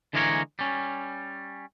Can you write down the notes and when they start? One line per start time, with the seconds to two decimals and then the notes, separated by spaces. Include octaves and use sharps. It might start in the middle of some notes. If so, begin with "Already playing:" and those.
0.13 D3 E3 G#3 A#3 A#4 C#5
0.59 G3 C#4